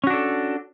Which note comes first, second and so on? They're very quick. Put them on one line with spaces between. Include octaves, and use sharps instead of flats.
C#4 F#4 D4 A4